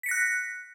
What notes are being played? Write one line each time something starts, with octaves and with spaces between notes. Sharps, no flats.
F#6 A#6 B6 C#7